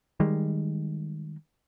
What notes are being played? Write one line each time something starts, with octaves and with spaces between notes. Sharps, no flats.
D#3 G3 G#3